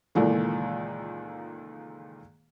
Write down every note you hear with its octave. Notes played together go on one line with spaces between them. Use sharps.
C#2 A#2 D#3 E3 A3